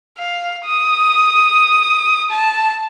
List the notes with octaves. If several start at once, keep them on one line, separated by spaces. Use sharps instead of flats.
F5
D#6
A5